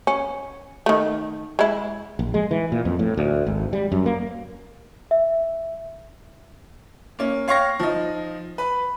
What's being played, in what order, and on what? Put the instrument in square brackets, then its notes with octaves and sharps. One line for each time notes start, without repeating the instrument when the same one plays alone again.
[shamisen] C#4
D#3 A3
G#3 E4
[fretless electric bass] A#1
G#3
E3
A#2
F2
A2
D2
G#1
G3
F#2
A#3
[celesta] E5
[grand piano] A#3 C#4
C#5 F5 G5 C#6 A#6
F3 D#4
B4 B5